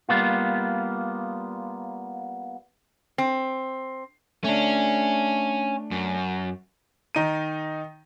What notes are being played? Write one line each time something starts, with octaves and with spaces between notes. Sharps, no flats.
G3 A#3 B3 F4
C4
A3 C#4 D4
F#2
D#3 D#4 D#7